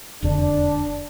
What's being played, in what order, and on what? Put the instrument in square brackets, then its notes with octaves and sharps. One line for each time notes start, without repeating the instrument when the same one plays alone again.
[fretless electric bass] E1 F2 D3 [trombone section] D4